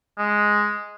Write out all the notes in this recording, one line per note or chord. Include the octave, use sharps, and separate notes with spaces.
G#3